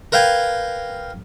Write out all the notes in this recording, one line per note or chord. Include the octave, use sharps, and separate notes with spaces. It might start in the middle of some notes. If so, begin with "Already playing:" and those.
A#4 B4 F5 G5 G#5